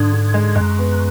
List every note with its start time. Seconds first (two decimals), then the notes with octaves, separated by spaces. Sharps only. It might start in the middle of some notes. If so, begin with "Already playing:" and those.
Already playing: G#2 D3 D4
0.12 D3
0.34 G#3
0.56 F#2 G#3
0.79 B3